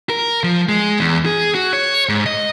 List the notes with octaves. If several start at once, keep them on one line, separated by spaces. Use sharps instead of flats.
A#4
F3
G#3
E2
G#4
F#4
C#5
G#2
D#5